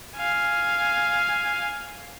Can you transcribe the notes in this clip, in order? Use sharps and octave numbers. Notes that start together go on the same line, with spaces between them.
F5 G#5